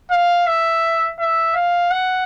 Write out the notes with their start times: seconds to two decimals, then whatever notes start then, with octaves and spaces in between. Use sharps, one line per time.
0.11 F5
0.47 E5
1.20 E5
1.55 F5
1.91 F#5